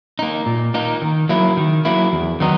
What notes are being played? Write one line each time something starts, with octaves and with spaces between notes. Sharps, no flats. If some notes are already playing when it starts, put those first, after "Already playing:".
A#3 D#4
A#2
A#3 D#4
D#3
F#3 A#3 E4
D#3
F#3 A#3 E4
E2
D#3 F#3 B3 D#4